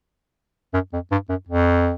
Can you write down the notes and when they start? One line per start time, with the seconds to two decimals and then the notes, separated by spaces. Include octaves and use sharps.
0.73 F#2
0.93 F2
1.11 G2
1.29 F#2
1.48 F2